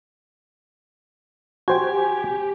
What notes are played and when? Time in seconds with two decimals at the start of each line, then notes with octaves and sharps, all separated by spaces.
1.68 F#4 G4 C5 G5 G#5